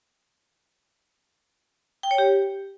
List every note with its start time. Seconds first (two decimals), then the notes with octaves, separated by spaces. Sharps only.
2.03 G5
2.11 C#5
2.18 G4